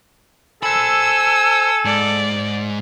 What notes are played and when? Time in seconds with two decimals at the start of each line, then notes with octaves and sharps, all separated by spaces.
0.63 A4 C5 G#5 B5 E6
1.85 G#2 D5